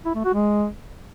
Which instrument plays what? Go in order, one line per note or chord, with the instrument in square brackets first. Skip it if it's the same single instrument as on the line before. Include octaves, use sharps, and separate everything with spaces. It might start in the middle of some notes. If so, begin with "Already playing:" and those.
[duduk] E4
A3
F#4
G#3